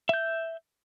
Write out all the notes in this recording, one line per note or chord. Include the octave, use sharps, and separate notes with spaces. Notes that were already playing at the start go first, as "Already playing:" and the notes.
E5 G6